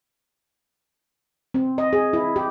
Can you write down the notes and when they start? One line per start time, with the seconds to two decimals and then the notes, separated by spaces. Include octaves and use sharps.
1.54 C4
1.78 D#5
1.93 G#4
2.13 E4
2.36 G4